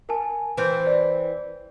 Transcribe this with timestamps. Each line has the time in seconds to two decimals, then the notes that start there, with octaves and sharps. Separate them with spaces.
0.09 A#4 G#5 A5
0.57 E3 C4 B4 C5 G6
0.87 D5